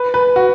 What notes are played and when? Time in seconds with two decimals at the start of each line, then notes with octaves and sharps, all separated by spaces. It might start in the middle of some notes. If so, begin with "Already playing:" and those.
Already playing: B4
0.14 B4
0.36 F#4